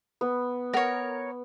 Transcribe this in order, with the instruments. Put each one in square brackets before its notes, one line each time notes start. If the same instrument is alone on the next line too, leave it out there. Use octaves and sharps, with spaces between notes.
[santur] B3
[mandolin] A#4 C#5 [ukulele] F#5